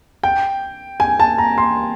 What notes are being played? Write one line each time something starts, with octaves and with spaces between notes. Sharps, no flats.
G5
G#5
A5
A#5
C6